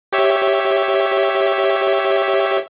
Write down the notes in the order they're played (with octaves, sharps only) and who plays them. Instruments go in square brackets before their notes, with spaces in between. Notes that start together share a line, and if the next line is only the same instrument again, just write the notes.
[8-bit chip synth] G4 C#5 E5